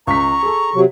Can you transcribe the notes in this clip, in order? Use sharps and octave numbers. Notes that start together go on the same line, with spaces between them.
C#2 A#5 C#6 B6
G#4 A4
C3 F#3